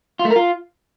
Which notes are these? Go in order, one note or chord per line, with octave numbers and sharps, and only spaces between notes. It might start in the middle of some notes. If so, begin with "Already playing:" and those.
F4
A3
A#4
F4